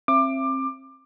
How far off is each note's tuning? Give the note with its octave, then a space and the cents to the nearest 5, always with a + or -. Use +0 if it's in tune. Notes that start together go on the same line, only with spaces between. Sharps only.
C4 +30 E5 +25 D6 +20